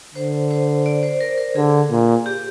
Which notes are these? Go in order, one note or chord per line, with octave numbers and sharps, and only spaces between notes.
D3 C5
C5
D5
C5
A#4
A#4
D3 G#4
A#2
G4